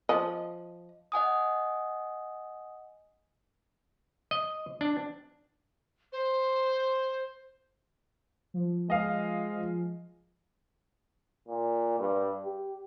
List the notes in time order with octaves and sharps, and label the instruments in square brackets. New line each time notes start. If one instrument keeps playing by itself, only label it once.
[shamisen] F3 D#5
[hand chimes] D#5 F#5 G#5 D#6
[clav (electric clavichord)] D#5
D4
[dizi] C5
[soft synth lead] F3
[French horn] G#3 [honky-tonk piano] D#5 F5
[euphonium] A#2
G2
G4